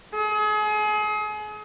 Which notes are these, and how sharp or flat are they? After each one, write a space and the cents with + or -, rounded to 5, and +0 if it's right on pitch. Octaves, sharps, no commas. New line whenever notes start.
G#4 +35